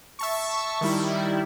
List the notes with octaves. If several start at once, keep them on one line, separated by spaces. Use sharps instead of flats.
E5 A5 C#6
D#3 G3 E4